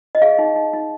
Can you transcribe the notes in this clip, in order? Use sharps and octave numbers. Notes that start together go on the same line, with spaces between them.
D#5
G#4 F5
D#4
D#4
D#4